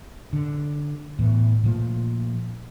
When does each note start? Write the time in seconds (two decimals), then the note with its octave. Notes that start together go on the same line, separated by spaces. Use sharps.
0.33 D3
1.19 A2 E3 B3
1.63 A#2 F3 A3